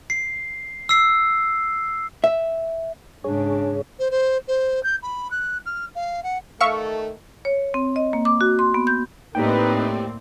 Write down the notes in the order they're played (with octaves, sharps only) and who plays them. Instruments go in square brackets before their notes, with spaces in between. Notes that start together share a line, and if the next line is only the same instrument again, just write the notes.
[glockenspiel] C7
E6 C7
[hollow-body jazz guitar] E5
[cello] G#2 C#3 [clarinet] D4 [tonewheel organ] G#4 C#5
[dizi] C5
C5
C5
G6
B5
F#6
F6
F5
F#5
[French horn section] D#3 A3 A4 [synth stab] E5 F5 C#6
[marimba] C#5
C4
D#5
A#3
D6
F#4
C6
B3
G6
[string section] A2 C4 [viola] A#3 D5 [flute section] D#4 B4 [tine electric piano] G4 G5